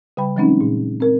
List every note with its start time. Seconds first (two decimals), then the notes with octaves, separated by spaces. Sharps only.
0.17 C#3 G3 G5 B5
0.36 E3 F#3 G#3 C4 C#4 D#4
0.61 A#2
1.00 C4 A#4